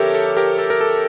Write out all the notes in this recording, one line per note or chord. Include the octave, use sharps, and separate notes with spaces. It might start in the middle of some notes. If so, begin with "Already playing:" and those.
Already playing: F2 D3 G4 A4 A#4 C#5 E5
A4
G4 A#4
A4
A#4
A4